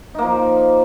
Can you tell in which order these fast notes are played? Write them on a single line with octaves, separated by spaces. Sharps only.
D#4 A#3 F3